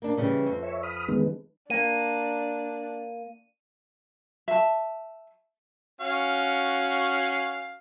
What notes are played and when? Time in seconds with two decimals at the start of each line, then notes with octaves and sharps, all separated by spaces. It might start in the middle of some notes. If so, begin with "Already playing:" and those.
0.02 A#3 D4
0.18 C#3 E3 G3
0.46 F2
0.63 C#5 E5
0.83 B5 D#6 F6
1.08 D#3 G#3 B3
1.70 A#3 D4 D#7
4.48 E5 A5
6.01 C#4 F#4 F5